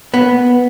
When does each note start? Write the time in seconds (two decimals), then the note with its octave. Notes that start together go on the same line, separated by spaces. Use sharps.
0.14 B3